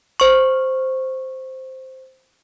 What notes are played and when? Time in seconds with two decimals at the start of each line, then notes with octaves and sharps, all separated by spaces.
0.20 C5 C#6